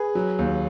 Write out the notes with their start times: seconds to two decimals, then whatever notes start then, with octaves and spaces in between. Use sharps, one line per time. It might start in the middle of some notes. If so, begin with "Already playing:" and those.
Already playing: G#4 B4
0.15 F#3
0.39 D#2